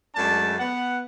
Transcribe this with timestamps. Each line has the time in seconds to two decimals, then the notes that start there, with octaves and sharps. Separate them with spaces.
0.16 F#2 G#3 A3 D4 A5
0.59 B3 F#5